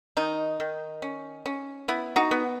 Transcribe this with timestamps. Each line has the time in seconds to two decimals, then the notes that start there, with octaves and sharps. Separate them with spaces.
0.17 D#3 D#4
0.60 D#3
1.02 C#4
1.46 C#4
1.88 B3 E4
2.16 D#4 F#4
2.31 B3